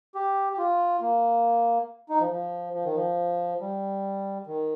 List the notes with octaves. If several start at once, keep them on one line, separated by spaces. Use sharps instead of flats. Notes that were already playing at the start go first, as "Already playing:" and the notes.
G4
G4
F4
A#3
D#4
F3
F3
F3
D#3
F3
G3
D#3